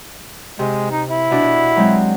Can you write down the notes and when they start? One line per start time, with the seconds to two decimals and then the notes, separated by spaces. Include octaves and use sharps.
0.59 C3 G#3
0.91 D#4
1.10 E4
1.31 B2 D4
1.76 F#3 G#3 C4